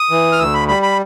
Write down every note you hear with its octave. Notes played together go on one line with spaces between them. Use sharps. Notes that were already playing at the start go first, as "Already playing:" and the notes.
Already playing: D#6
E3
F6
D2 E6
B5
G3 B5
B5